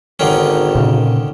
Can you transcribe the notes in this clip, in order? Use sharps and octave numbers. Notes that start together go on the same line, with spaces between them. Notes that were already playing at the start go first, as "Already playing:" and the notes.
G#1 D3 D#3 C#4
A#2 C#3